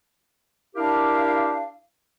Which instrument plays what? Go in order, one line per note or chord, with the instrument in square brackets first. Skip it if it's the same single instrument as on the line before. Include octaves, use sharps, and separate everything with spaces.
[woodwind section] D4 E4 G4 A#4 F5